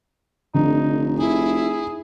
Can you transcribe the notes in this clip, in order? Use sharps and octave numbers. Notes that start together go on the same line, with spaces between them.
F1 D3 D#4
D#4 E4 G#4